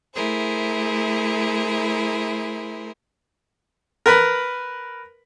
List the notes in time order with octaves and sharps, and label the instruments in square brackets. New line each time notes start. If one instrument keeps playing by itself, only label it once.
[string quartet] A3 E4 G#4 A#4 C5
[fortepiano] A#4 B4 B5